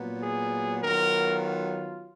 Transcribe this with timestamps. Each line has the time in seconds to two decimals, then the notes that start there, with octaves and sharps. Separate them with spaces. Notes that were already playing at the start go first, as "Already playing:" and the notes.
Already playing: A#2 F#3 B3
0.21 G#4
0.82 D#3 F#3 B3 F4 A#4